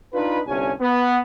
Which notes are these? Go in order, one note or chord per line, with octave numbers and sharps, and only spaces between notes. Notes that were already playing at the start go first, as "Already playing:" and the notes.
D4 D#4 F4 B4
G1 C2 G2 C#4 D4 G#5
B3